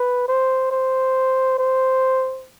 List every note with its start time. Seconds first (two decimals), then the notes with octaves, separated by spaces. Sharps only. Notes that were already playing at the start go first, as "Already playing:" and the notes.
Already playing: B4
0.28 C5
0.71 C5
1.58 C5